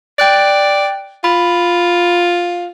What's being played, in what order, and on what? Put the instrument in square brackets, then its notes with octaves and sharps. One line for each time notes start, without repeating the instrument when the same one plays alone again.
[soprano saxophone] D5 [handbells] G5 F#6 A6
[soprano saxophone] F4 [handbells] B5